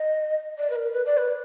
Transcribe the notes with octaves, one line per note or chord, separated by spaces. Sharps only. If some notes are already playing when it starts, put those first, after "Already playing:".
Already playing: D#5
D5
B4
A#4
B4
D5
B4